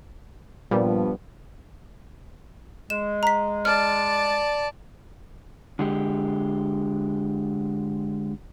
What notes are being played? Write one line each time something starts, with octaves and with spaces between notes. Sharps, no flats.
G2 A#2 F3 G3 B3
G#3 E7
A#5 B6
D5 A5 F6
D3 G#3 G4